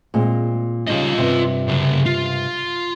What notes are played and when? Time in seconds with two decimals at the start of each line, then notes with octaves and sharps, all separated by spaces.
0.14 A#2 G#3 C4
0.88 C#3 G3 D#4 F4 D#5
1.18 G2 C3
1.68 C#3 F#3
2.06 F4